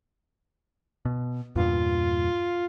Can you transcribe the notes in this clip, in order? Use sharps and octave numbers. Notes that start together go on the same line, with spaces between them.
B2
E2 G2 A#2 F4